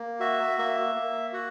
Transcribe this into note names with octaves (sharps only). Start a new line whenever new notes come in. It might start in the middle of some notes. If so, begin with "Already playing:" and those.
Already playing: A#3
F#4 E5
A#3 E5
A#3
F#4 F#5